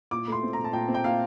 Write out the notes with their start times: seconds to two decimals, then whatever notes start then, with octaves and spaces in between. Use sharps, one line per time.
0.11 A#2 D6
0.28 A3 C6
0.43 C4
0.53 A#5
0.58 A#2
0.64 A5
0.73 A#2 G5
0.88 C4
0.94 G5
1.04 A#2 F5